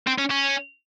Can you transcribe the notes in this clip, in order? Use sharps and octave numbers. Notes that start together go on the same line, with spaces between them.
C4
C#4
C#4